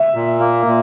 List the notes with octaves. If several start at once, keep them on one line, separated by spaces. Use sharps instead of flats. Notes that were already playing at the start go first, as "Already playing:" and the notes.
Already playing: E5
A#2
A#3
A#2